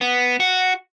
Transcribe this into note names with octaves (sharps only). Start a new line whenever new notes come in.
B3
F#4